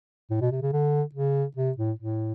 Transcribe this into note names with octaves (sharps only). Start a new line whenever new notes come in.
A2
B2
C3
C#3
D3
C#3
C3
A2
A2